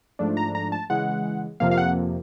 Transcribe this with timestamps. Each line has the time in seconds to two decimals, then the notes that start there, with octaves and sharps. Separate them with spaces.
0.19 G#2 F3 A3 D4
0.37 A#5
0.55 A#5
0.72 A5
0.90 C#3 E3 G#3 F#5
1.60 F2 C3 F3 A#3 F5
1.71 F5
1.78 F#5